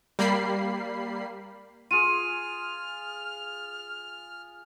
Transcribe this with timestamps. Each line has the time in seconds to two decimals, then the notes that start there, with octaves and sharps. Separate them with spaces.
0.19 G3 A#3 B5 C7
1.91 F4 G#4 F6 D#7